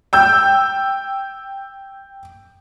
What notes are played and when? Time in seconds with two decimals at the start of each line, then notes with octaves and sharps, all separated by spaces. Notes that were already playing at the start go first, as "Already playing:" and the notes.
0.13 G5 E6 G6